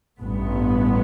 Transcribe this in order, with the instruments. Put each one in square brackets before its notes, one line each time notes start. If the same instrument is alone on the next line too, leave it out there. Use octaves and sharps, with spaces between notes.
[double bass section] A1 G2 B3